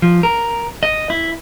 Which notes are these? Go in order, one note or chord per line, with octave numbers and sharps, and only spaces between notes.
F3
A#4
D#5
E4